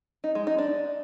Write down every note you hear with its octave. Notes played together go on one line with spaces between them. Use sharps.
D#4
G#3
D#4
D4